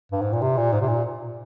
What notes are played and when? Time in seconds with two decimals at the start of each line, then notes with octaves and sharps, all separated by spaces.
0.11 G2
0.22 G#2
0.32 A#2
0.42 C3
0.57 A#2
0.72 G#2
0.81 C3
0.87 A#2